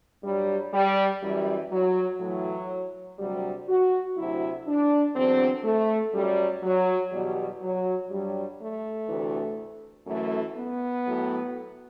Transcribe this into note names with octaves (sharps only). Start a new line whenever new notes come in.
G2 F#3 G3
G3
F#2 E3 G3
F#3
A2 E3 F#3
D2 C3 F#3 G3
F#4
D2 C3 F#3 E4
D4
E2 D3 F#3 C4
A3
F#2 F#3 G3
F#3
E2 B2 F#3 G3
F#3
G2 F#3 G3
A3
D2 C3 E3
F#2 E3 A3
B3
A2 F#3